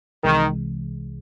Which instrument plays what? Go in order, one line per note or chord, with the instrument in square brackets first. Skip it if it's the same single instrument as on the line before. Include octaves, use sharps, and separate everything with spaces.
[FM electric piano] C2 C3 E3 G#3 [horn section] D#3